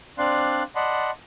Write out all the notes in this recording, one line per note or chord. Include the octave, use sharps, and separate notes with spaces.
C4 D4 D5 F5 C6 F#6
D5 D#5 F#5 A5 B5 C6